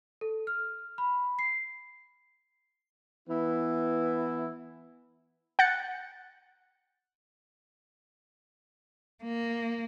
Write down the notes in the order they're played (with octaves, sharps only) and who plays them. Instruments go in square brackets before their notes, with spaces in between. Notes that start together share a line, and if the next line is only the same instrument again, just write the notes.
[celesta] A4
F6
B5
C7
[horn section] E3 B3 E4
[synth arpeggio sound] F#5 F#6 G6 A6 C#7
[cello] A#3